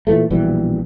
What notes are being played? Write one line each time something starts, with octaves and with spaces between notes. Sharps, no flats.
A#2 E3 A3
A#1 B2 E3 G3